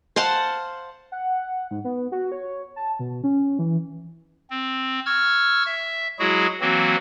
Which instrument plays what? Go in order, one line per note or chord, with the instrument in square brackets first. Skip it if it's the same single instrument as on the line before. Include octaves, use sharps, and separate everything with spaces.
[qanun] C5 F5 F#5 A5
[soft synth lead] F#5
G#2
B3
F#4
C#5
A5
B2
C#4
E3
[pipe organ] C4
C#6 E6 F6 G#6
E5
F#3 G#3 E4 F#4 G#4
E3 F#3 A#3 C4 F#4